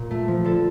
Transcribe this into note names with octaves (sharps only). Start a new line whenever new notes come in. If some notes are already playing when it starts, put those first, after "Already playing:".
Already playing: A#2
A3
F3
D3 A4